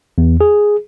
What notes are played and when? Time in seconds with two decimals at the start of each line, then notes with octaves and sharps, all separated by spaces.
0.18 E2
0.41 G#4